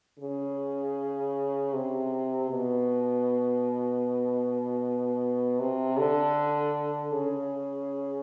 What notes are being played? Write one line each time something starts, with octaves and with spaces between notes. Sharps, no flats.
C#3
C3
B2
C3
D3
C#3